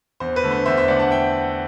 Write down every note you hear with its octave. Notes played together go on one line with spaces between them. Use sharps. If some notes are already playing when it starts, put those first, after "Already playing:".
E2 C5
B4
D3 A3
C5
E2 C5 E5
C5 E5
D3 A3 D5 F#5
F#5 A5
E5 G5